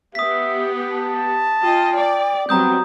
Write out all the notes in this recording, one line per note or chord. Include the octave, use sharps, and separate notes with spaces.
B3 G4 E5 D#6 B6
A5
F4 D#5 G5
D5
F#3 G3 B3 C4 A#5 D#6 G6